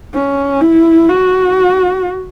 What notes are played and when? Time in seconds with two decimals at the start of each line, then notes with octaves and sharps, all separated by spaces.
0.14 C#4
0.61 E4
1.08 F#4